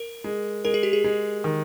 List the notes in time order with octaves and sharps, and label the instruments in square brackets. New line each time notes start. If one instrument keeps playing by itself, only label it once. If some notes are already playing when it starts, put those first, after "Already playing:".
Already playing: [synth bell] A#4
[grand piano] G#3
[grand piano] G#3 [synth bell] A#4
[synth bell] G#4
G4
G#4
[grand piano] G#3
D#3